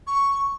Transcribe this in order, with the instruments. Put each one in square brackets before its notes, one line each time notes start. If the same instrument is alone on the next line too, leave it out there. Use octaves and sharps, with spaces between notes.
[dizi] C#6